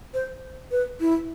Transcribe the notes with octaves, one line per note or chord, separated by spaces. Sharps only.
C5
B4
E4